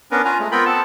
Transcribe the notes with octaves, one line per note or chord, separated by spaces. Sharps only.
B3 C#4 D4 A#4 B4
C#4 F4 B4 G#5 A#5
G#3 A3
B3 C4 F4 A#4 G5 B5
B3 C4 A4 A5